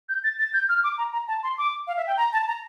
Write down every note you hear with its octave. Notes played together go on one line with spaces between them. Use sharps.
G6
A6
A6
G6
F6
D6
A#5
A#5
A5
C6
D6
F5
E5
G5
A#5
A5
A#5